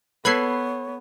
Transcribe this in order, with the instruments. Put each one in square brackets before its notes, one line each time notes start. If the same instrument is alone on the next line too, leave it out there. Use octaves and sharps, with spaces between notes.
[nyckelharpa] B3 [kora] A4 B4 [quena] C#5 [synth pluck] B5 G#6 C7